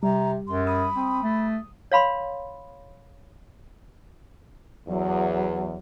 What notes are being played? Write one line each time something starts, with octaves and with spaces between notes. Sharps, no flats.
C3 G3 A#5
F#2 C6
B5 D#6
C4
A3
C#5 F5 B5 C6
E2 F#3